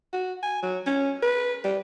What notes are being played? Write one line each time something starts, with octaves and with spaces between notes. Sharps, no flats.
F#4
G#5
F#3
C#4
B4
G3